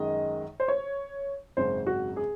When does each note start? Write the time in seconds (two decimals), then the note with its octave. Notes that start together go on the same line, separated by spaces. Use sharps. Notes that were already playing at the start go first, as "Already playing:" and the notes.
Already playing: F#2 D#3 G#3 D#5
0.60 C5
0.68 C#5
1.57 G#1 F#2 C#3 C5
1.87 F#4
2.16 G#4